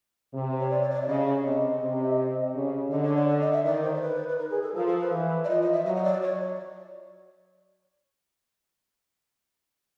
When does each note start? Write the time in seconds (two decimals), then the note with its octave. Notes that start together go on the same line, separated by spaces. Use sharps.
0.33 C3
0.60 C#5
0.70 D5
0.82 C#5
0.90 D#5
0.94 D5
1.02 E5
1.07 C#3 D#5
1.44 C3 D#5
1.80 C3
2.54 C#3
2.90 D3 D#5
3.03 C#5
3.16 D5
3.28 D5
3.40 D#5
3.52 E5
3.64 D#3 D5
3.83 C5
3.95 A#4
4.01 B4
4.29 B4
4.38 A#4
4.50 G#4
4.62 A4
4.74 F3 A#4
4.87 A4
5.00 B4
5.12 E3
5.44 D5
5.48 F3 D#5
5.61 D#5
5.72 E5
5.85 F#3 D#5
5.95 D#5
6.04 D5
6.22 C#5